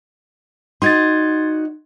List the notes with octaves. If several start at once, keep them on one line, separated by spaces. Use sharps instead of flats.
D#4 F#4 D5 C6 G#6 A6